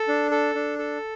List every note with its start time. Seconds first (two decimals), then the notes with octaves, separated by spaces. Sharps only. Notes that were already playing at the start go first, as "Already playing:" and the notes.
Already playing: A4
0.08 D4
0.31 A4
0.55 D4
0.78 A4